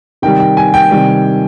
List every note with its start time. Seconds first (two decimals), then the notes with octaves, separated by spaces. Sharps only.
0.22 C3 D#3 G3 G5
0.40 G5
0.57 G#5
0.74 G5
0.91 C3 D#3 G3